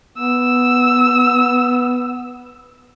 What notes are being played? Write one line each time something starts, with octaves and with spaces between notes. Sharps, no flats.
B3 E6